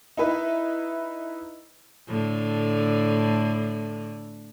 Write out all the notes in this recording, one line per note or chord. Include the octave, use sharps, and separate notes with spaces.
D#4 E4 B4 E5
A2 D3